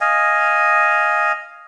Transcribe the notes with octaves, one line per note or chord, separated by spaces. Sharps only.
D#5 F5 G#5